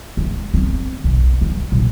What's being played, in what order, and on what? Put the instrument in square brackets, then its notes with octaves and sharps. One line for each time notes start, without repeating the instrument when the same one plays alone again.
[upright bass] G#3
C4
B1
G3
A#2